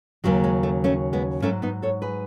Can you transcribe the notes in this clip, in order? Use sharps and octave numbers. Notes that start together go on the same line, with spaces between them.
D#2 C#3 F#3 G#3
G#3
A3
A3 C#4
G#3 B3
G#2 F#3 A3 C#4
B3 D#4
A4 C#5
G#4 B4